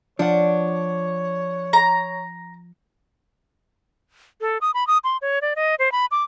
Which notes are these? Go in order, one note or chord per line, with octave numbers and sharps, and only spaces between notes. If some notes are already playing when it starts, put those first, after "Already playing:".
F3 D4 C#5 F#5
A#5
A4
D#6
B5
D#6
C6
C#5
D5
D#5
C5
B5
D6